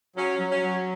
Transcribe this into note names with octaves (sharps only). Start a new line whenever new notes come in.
F#3 C#4
F#3
C#4
F#3